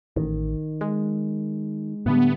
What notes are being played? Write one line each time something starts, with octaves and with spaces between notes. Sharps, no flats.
A1 D#3
G#3
A2 D3 G3 B3